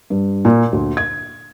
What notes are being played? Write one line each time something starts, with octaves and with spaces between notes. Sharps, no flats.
G2
A#2
D2
G#6